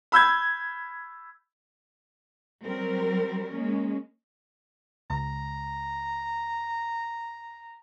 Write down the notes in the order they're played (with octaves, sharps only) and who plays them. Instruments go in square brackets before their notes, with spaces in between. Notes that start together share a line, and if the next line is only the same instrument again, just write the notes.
[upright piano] B5 E6 G6 G#6
[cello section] F#3 G3 C4 A#4
G#3 A#3 C#4
[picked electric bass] C#2 [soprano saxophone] A#5